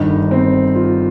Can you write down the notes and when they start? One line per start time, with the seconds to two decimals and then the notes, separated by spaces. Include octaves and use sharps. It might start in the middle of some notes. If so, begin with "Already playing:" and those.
Already playing: G1 G2 D#3 D#4
0.31 C4
0.75 F4